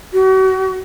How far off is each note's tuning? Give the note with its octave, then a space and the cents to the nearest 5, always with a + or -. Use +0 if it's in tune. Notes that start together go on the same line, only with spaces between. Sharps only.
F#4 +40